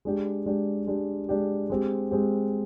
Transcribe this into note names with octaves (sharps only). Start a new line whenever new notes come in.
G#3 D4 G4
G#3 D4 G4
G#3 D4 G4
G#3 D4 G4
G#3 C4 G4
G#3 C4 G4